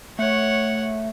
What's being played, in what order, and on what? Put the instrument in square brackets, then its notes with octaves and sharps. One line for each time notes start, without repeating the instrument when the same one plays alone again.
[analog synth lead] A3 [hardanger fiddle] C#5 F#5